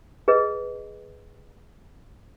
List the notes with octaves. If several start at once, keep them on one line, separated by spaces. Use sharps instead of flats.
G#4 B4 D#5